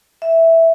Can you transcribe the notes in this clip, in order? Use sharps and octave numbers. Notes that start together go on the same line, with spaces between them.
E5